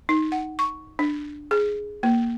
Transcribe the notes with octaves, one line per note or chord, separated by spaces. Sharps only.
D#4
F#5
C#6
D4
G#4
A#3